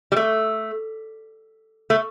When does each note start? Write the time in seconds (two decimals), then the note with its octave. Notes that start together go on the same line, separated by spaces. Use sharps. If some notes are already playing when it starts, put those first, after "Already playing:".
0.12 G3
0.16 A3
1.90 A3